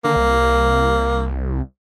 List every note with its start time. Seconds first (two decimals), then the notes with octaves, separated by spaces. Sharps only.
0.05 D3 A#3
0.16 C2